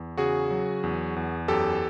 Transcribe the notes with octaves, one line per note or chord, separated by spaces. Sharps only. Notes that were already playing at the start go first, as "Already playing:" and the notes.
Already playing: E2
C#3 F#4 G#4
F#3
E2
E2
F#2 G4 A4